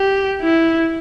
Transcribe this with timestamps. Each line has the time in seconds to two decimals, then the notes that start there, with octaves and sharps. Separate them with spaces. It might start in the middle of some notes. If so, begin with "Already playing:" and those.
Already playing: G4
0.42 E4